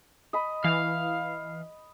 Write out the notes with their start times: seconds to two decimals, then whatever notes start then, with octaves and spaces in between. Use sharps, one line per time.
0.33 D#5 B5
0.64 E3 F5